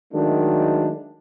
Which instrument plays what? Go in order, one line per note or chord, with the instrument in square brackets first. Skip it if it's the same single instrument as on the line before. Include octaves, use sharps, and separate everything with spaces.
[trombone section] D#3 F#3 G#3 A3 D4